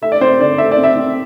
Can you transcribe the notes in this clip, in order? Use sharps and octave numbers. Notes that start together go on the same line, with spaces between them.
A3 E5
D5
C4 C5
D3 D5
A3 E5
D5
C4
E5
C4